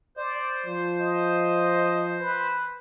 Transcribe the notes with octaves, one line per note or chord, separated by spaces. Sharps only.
C5 D5
F3
D#5
B4